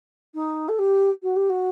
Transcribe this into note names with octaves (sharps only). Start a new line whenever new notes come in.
D#4
A4
G4
F#4
G4
F#4